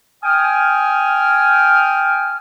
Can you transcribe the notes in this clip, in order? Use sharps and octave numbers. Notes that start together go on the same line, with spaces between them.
G5 G#5 D#6 F6